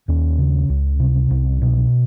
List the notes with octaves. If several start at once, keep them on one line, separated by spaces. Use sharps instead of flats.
D#2 C#4
C#3
C#2
C3
C2
B2